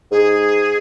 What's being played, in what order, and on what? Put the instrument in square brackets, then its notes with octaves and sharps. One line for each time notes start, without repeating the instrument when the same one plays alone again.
[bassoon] G#2 [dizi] G#4